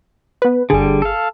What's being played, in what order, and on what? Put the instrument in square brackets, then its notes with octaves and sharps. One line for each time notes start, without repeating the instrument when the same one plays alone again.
[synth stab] B3 B4
[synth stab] G1 G#4 [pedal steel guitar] D3 G3
[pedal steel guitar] A4 F5